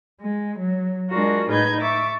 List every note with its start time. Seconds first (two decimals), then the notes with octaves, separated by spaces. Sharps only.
0.20 G#3
0.58 F#3
1.09 G#3 D4 F4 F#4 A#4
1.49 A2 D#4 G#4 B4 G6 G#6
1.81 E5 C#6 D6 A6